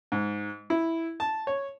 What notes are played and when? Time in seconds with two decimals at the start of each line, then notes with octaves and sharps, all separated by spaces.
0.12 G#2
0.70 E4
1.20 A5
1.47 C#5